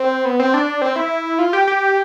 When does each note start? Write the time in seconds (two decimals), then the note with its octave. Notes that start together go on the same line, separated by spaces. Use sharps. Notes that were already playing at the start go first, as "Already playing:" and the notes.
Already playing: C4
0.25 B3
0.39 C4
0.54 D4
0.82 C4
0.96 E4
1.39 F4
1.53 G4
1.67 G4